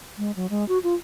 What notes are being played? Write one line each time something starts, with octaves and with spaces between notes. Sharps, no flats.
G#3
F#3
G#3
F#4
F4